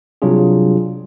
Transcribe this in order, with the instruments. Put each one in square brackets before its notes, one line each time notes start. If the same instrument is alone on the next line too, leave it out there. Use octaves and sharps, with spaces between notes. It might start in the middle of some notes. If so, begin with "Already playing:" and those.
[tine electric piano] C3 F#3 G3 D4 F4 G#4